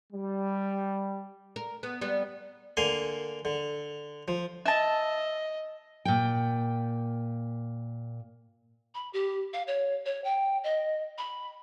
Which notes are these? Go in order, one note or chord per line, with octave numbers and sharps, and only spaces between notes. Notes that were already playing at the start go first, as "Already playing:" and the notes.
G3
A#4
B3
G3 B3
D3 A#3 G#5 C6
D3
F3
D#5 E5 A5
A#2 G5
B5
G4
F5
C#5
C#5
G5
D#5
B5